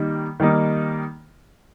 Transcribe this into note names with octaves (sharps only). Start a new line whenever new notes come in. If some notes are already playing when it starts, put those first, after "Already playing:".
Already playing: D#3 G3 A#3 D#4
D#3 G3 A#3 D#4